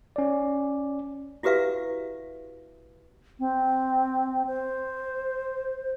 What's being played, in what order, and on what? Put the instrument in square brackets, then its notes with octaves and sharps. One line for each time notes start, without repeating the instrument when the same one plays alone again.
[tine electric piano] C#4 D5
[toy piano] E4 F#4 G4 B4 E5 F5
[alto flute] C4
C5